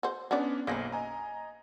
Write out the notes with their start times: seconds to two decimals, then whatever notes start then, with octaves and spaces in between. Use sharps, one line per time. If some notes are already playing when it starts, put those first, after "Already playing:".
0.03 F#4 C5
0.31 B3 C#4 D4 F#4 D5
0.67 B1 F#2 A#3 C#4 C5 A#6
0.92 D#5 G#5 A#5